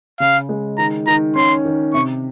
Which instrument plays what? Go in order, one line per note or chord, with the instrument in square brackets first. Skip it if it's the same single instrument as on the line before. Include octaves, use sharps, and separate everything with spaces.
[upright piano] C#3 [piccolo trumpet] F5
[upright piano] G#3
[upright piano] D#3 [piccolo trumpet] A#5
[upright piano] D#3 [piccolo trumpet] A#5
[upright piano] C#4 [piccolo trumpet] C6
[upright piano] D#3
[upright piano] C3 [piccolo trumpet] C#6